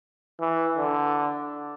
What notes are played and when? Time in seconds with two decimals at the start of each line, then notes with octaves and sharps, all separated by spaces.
0.40 E3
0.77 D3